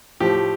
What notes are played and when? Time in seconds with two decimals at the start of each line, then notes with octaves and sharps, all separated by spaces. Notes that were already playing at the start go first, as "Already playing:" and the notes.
0.20 A2 F3 G4